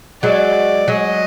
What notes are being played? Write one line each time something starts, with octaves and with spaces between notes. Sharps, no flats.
F#3 G#3 D5
F#3 G#3 D#5